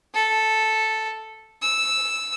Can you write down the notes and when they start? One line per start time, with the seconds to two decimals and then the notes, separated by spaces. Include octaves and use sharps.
0.14 A4
1.62 E6